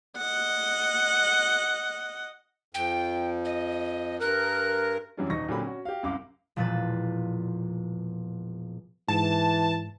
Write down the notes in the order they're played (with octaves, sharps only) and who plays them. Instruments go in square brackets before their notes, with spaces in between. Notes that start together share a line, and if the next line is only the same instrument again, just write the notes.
[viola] D#5 F#5
[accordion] F2 [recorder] G5
[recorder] D#5
[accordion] G2 A#4 [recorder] F#6
[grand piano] F#2 E3 F#3 G3 C#4 D4
D#1 D#4 C#6 A#6
A#2 D3 F#3 C4 G4 B5
C#4 F#4
G4 F5
C2 F#2 F5 D6
[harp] E1 A#2 F3 B4 A6
[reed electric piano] G#2 A6 [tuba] E3 [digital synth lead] A5